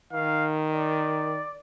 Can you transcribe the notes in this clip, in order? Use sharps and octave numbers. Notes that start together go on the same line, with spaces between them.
D#3 F5
D5